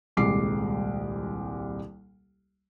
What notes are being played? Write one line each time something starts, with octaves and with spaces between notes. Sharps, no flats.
D#1 C2 G#3 D6 C7